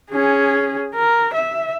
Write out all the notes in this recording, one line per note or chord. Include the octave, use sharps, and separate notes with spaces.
C#4 G#4
A#4
E5